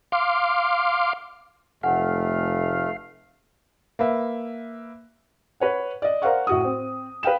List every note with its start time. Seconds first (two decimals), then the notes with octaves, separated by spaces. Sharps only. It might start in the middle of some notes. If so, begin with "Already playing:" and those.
0.12 F5 C6 D6
1.83 F1 A3 F5 F#5 G#5
3.99 A#3 B4 E5
5.60 B4 C#5 F#5
6.02 D5 D#5
6.22 A#4 C5 D5 F5 F#5 C#6
6.47 A2 F#4 D#6
6.65 C4
7.23 B4 F5 G5 E7